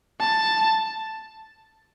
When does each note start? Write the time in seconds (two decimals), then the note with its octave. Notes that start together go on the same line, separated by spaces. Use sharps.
0.20 A5